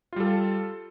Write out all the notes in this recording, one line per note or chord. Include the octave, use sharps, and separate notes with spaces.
G3 F4 A4